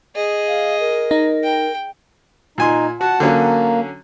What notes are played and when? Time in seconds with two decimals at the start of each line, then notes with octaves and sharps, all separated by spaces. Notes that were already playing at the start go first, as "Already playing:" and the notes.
0.16 G#4 D#5
0.48 F5
0.80 A#4
1.11 D#4
1.44 G5
2.58 A#2 D#4 G#5 C6
3.01 F#4 F#5 A5
3.20 D3 F#3 A#3 C#4